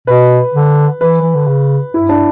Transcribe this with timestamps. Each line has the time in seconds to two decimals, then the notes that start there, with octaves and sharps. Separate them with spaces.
0.07 B2 B4
0.54 D3
1.01 E3 B4
1.21 E3
1.35 D3
1.47 C#3
1.94 G2 E4
2.09 D4